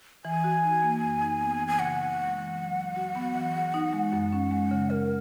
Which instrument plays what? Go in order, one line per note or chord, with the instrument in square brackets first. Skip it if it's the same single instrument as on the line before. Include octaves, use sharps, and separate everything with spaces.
[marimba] E3 [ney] G#5
[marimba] F#4
D#4
A#3
F#2
D#4
B3
E3
[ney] G#5
[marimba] C#3 [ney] F#5
[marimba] D#4
G#3
E3
F#3
F#3
F#4
B3
E3
G#4
D#4
G#3
F#2
C#4
G#3
C#3
[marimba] C#3 [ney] A#4